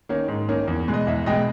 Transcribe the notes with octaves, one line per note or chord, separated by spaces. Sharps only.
D#3 A#3 C#4
G#2
D#3 A#3 C#4
E2
B2 G#3
D#5
E2 E5
B2 G#3 D#5 G5